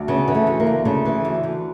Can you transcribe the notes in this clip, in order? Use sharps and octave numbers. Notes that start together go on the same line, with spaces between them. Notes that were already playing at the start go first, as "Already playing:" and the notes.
Already playing: D2
C#3 B3
E3
A3
D2
A#3
D2
C#3 A3
E3
D2
D2